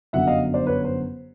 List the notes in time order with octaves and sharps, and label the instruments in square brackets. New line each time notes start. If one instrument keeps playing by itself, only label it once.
[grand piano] G1 F#2 D3 F#3 E5 F#5
D#5 F5
C5 D5
B4 C#5
C5